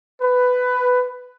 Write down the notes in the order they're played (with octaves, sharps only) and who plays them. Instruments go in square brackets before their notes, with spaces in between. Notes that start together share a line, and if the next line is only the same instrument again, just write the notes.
[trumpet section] B4